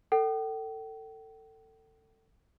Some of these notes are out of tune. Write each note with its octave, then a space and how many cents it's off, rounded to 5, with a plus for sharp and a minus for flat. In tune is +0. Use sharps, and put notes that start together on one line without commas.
A4 +25 G5 -35